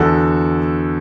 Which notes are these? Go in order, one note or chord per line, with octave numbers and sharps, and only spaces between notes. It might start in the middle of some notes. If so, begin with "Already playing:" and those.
Already playing: E2 D3 F#4 A4